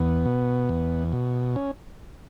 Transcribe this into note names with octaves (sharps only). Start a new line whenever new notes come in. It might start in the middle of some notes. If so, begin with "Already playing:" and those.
Already playing: E2 B3
B2
E2
B2
C#4